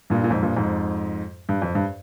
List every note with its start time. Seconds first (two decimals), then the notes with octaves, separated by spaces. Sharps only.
0.10 G2 A#2
0.24 A#2
0.30 F2 G#2
0.43 G2 A#2
0.56 F2 G#2
1.49 G2
1.62 F2
1.75 G2